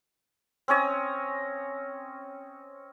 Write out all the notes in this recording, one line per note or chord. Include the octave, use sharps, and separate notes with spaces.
C4 C#4 C#5 D#5